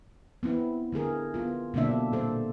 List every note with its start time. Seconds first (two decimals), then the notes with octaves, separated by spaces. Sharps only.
0.43 B3 C4 E4
0.92 D3 A3 G#4 A#4
1.34 B3 F4
1.74 B2 D3 A#3 C4 D4 E5
2.12 A#2 G3 A4 C5